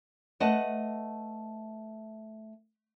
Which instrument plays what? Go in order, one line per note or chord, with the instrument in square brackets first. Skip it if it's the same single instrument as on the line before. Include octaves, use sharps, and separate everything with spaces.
[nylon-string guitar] A3 B4 D#5 F#5 A5